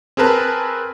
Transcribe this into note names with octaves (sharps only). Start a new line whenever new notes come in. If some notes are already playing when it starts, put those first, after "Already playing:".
C4 G#4 A#4 B4 A5